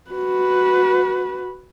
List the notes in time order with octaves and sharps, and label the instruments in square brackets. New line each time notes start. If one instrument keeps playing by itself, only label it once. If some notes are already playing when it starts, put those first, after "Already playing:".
[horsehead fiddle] F#4 B4